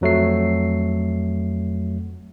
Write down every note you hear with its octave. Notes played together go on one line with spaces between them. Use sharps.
F2 F#3 A3 C7